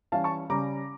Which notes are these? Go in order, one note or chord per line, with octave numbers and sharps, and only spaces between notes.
E3 G3 C#4 F5 A5
A5 C#6
C#3 G3 C#4 A#5 D6